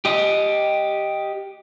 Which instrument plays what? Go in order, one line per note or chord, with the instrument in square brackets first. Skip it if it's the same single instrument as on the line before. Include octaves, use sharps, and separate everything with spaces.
[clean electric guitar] G4 D#5